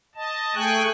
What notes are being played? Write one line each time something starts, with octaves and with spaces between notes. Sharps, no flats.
D#5 A5
A3 G#4 G5 G#5 C#6 F#6